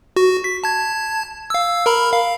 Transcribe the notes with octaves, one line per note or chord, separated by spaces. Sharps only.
F#4
B6
A5 G#6
F5 E6
A#4 A#5 B5
F5